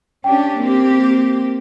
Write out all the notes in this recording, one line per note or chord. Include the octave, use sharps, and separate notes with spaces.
C#4 D4 G4 G5
A#3 C4 G4